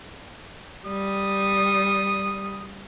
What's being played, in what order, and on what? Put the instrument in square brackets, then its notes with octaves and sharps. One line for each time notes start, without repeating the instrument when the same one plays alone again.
[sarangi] G3 [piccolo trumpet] D#6